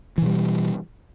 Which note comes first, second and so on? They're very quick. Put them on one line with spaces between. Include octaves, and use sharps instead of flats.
E3 B2 G3